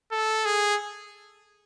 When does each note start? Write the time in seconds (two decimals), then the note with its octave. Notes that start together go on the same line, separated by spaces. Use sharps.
0.12 A4
0.45 G#4